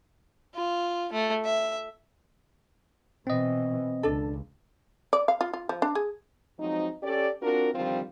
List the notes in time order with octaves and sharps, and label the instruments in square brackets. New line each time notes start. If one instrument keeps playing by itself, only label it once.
[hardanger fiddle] F4
A3
E5
[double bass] B2 E3 [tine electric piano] C4 D#5
[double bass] C#2 [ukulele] D4 A4
[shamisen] D5
F5
F4
F4
F3
D4
G#4
[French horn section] F3 F#3 G#3 C4 D#4
C#4 G4 A4 D5
C4 D4 F4 F#4 A#4
D3 D#3 F3 G3 C4 F4